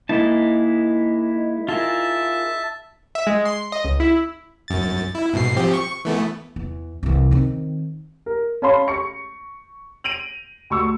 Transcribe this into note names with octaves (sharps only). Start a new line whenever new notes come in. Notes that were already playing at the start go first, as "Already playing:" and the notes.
G#3 A#3 D#4 E4 A5
F4 G#4 A#4 E5 A5
E5
G#3
C6
D#5
C#2
E4
F#2 A6
E4
G#2 B2 C7
F3 C4 G4
C#6
E3 A3 B3
E2
C2 E3
D#3 C4
A#4
C#4 C#5 F5 A5 B5 C6
C#6 C#7
D7 D#7 F7 F#7
D2 C6 C#6 E6